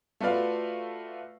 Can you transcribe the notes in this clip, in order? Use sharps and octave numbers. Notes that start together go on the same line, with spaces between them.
A3 F4 F#4 B4 D5 F5